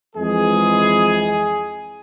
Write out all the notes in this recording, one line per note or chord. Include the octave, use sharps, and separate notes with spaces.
F2 E3 G#3 G#4